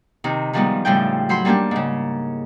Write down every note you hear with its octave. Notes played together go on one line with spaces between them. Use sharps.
C3 D#3 D#4
D#3 F3 G3 G#3 B3 D#4
A2 C#3 F3 G3 G5
F#3 C5 B5 C6
G3 A#3 C#4 D4 G4
G#2 C#3